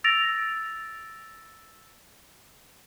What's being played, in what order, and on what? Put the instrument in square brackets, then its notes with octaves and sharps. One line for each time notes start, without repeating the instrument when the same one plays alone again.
[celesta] E6 A6 A#6 D7 F7